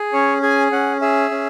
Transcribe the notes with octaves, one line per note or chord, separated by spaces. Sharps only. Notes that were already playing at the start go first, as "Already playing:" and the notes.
Already playing: G#4
C#4 C#5
G#4 G#5
C#4 F#5
G#4 E5
C#4